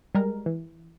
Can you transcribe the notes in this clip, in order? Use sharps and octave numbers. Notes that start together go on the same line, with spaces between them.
G3 G#3 A#4
E3